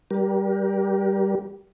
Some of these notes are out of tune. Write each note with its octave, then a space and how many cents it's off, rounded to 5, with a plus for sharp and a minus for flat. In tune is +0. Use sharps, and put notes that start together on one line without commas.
G3 -5 G4 -5 A#4 +35